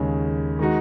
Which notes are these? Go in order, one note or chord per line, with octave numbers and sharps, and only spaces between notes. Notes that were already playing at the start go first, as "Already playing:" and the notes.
Already playing: D#2 C#3 G#3 C#4
D#3 G#3 D#4 F#4